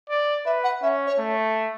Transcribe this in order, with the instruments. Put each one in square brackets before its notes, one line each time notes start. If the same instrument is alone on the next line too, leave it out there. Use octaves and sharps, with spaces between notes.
[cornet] D5
[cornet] B4 [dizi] E5
[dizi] F#5
[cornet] C#4 [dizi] E5
[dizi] C#5
[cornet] A3